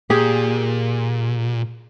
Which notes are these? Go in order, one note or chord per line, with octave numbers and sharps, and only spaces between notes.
A#2 G4 G#4